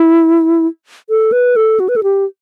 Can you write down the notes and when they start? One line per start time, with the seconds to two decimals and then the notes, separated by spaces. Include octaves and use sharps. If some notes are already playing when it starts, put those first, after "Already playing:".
Already playing: E4
1.10 A4
1.32 B4
1.56 A4
1.80 F#4
1.89 B4
1.96 A4
2.03 G4